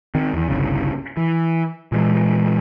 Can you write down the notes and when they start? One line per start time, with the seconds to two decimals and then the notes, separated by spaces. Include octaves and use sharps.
0.15 D#3 C4
0.33 E2
0.49 G1 C2 C#3
1.17 E3
1.92 A#2 E3 G#3